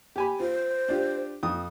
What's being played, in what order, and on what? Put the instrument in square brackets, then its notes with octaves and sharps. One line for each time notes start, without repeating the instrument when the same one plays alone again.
[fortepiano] G4 G#5 B5
[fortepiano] F4 [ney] C5
[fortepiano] D4 F4 G4
F2 D#6